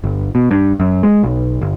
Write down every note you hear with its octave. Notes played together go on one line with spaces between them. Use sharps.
G1
B2
G2
F#2
G#3
B1
G1